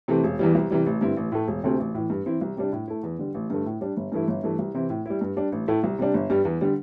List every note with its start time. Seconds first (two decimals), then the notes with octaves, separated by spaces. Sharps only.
0.08 C3 E3 A3 C4
0.24 E1
0.39 E2 E3 G3
0.55 C2
0.71 C3 E3 G3
0.86 A1
1.01 G2 D3 C4 E4
1.17 A1
1.32 A2 A3
1.48 E1
1.64 D2 C3 A3 C4
1.79 A1
1.95 A2 E3
2.10 G2
2.26 E3 C4 E4
2.41 C2
2.57 C3 G3 D4
2.72 A2
2.88 A3 E4
3.03 E2
3.19 D3 G3
3.34 A1
3.50 G2 D3 A3
3.66 A2
3.81 G3 D4
3.97 G1
4.12 G2 E3 A3 E4
4.28 G1
4.43 G2 E3 A3
4.59 C2
4.74 C3 E3 C4 E4
4.90 A2
5.06 G3 E4
5.21 G2
5.37 G3 D4
5.52 A1
5.68 A2 A3 E4
5.84 C2
5.99 C3 G3 D4
6.14 G1
6.30 G2 G3
6.45 E2
6.61 D3 G3